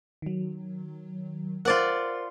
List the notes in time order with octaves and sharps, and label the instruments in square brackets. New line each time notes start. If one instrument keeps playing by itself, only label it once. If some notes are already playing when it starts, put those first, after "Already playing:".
[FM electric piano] D#3 F#3
[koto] F4 D5 F#5 [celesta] A#4 C5 A6